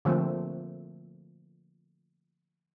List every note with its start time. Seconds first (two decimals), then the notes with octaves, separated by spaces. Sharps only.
0.05 D3 F3 A3 A#3 C4